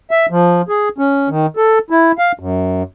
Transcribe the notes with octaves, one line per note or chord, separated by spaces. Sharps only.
E5
F3
G#4
C#4
D#3
A4
E4
F5
F#2